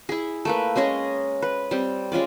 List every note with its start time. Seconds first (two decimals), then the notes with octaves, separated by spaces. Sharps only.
0.09 E4 G#4
0.45 A3 A#3 B4
0.76 G#3 C#4 G#4 D#5
1.42 B4
1.71 G3 C4
2.12 G#3 C#4 F4 D5